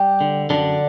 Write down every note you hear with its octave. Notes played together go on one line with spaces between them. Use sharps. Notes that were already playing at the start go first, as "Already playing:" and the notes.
Already playing: G3 G4
D3
F#2 D3 D4